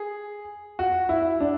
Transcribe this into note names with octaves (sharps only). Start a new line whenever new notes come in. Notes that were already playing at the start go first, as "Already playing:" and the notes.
Already playing: G#4
F#4
E4
D4